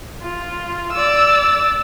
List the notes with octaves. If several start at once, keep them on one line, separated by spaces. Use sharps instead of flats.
F4
D5 E6